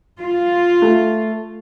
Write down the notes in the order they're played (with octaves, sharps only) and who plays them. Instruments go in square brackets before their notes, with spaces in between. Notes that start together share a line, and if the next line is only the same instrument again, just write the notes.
[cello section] F4
[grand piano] A3